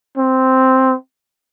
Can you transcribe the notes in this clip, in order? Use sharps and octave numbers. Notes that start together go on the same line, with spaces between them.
C4